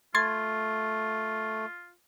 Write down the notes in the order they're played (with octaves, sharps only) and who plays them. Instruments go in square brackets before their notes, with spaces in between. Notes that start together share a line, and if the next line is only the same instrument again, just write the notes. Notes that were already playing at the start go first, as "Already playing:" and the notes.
[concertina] A3 [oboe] F4 [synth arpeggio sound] C6 G#6 A6